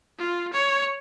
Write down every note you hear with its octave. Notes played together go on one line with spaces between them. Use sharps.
F4
C#5